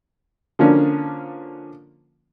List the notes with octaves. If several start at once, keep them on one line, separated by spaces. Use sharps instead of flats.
D3 F3 A#3 C#4 D4